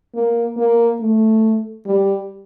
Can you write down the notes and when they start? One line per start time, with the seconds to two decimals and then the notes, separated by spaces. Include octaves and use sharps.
0.15 A#3
0.57 A#3
1.00 A3
1.86 G3